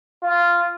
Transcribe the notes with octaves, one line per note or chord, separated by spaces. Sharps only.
F4